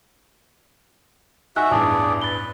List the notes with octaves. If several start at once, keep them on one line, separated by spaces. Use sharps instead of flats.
D#4 F#4 E5 G#5 E6 F#6
A1 E2 G2 G#4 D5 A5
B4 A6 G7